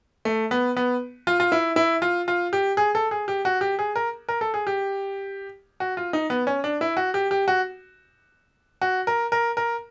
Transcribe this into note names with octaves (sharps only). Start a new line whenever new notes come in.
A3
B3
B3
F4
F4
E4
E4
F4
F4
G4
G#4
A4
G#4
G4
F#4
G4
G#4
A#4
A#4
A4
G#4
G4
F#4
F4
D#4
B3
C#4
D4
E4
F#4
G4
G4
F#4
F#4
A#4
A#4
A#4